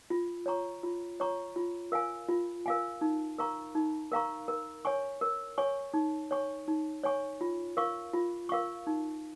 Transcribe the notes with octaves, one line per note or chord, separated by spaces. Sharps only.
F4
C#5 A#5 C#6
F4
C#5 A#5 C#6
F4
A#4 F5 G#5
F4
A#4 F5 G#5
D#4
A#4 F5 A#5 C#6
D#4
A#4 F5 A#5 C#6
A#4
C#5 G#5 C#6
A#4
C#5 G#5 C#6
D#4
C#5 G#5 C#6
D#4
C#5 G#5 C#6
F4
A#4 F5 C#6
F4
A#4 F5 C#6
D#4